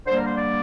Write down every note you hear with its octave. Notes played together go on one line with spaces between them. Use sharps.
D3 G3 A#3 C5
A#4
C5
D5